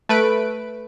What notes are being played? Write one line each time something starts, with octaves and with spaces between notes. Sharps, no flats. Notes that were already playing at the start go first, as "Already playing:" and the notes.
A3 B4 D7